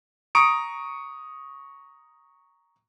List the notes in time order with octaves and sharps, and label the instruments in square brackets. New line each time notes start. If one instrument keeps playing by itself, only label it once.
[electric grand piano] A#5 C#6 D#6 C#7 D7